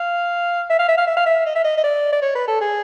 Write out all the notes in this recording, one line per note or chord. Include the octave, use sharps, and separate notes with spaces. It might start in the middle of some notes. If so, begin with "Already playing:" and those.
Already playing: F5
E5
F5
E5
F5
E5
F5
E5
D#5
E5
D#5
D#5
D5
D5
C#5
B4
A4
G#4